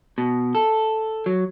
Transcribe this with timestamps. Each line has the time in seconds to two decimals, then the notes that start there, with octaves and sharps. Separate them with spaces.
0.18 B2
0.55 A4
1.26 F#3